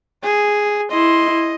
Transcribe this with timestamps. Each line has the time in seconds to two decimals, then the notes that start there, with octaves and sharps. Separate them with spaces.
0.24 G#4
0.91 E4 D#5 C6